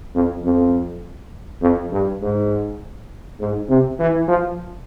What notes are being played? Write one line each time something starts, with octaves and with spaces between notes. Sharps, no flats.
F2
F2
F2
G2
G#2
G#2
C3
E3
F3